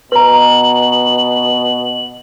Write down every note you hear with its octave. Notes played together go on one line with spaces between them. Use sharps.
B2 B4 A#5 F#7